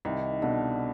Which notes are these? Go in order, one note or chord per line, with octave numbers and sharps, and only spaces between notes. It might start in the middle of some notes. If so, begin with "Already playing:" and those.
C2 D#3
B2 D3